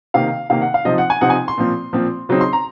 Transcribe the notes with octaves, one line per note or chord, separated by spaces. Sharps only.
C3 D#3 A#3 F5
C3 D#3 A#3 F5
F#5
F5
C3 F3 C4 D#4 D#5
F#5
G#5
C3 F3 C4 D#4 F#5
G#5
C6
A#2 F3 C4
A#2 F3 C4
C#3 F#3 C4 D#4
C6
A#5